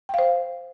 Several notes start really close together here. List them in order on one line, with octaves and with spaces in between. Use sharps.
G5 F5 C5